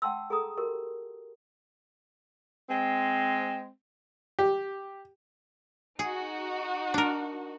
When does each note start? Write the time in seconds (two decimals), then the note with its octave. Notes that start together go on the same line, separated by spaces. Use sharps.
0.02 F#5 G5 A5 C6 E6
0.30 G#4 A4 A#5 D#6
0.57 F#4 G4 A#4
2.70 G#3 C4
4.39 G4
5.99 D#4 F#4 G#4
6.94 D4 A#4